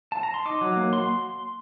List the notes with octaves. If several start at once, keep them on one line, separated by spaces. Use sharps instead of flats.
A5
A#5
C6
D#4 D6
F#3
A#3
F#3 C6